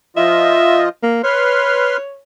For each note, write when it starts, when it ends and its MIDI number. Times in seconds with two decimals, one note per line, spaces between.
0.17 0.89 53
0.17 0.89 65
0.17 0.89 75
0.17 0.81 76
1.03 1.18 58
1.24 1.97 71
1.24 2.20 73
1.24 1.97 84
1.24 1.97 89